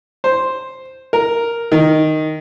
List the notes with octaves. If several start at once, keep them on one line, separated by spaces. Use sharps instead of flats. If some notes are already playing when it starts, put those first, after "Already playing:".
C5
A#4
D#3